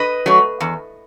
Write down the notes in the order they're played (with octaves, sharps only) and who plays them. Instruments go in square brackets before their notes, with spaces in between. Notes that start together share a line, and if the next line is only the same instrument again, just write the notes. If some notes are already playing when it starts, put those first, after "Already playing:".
Already playing: [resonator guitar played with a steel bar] B4 D#5
F#3 A3
E2